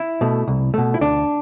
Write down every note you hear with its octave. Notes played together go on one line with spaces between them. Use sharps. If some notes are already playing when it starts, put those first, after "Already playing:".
Already playing: E4
B2 A3
C2
B2 A3
E4
D2 D4